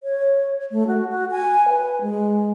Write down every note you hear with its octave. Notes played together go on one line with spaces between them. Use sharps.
C#5
A3
F#4
F#4
G#5
B4
G#3